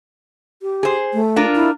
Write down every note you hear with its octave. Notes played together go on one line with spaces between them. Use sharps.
G4
G#4 C5
A3
D4 F4 A#4
E4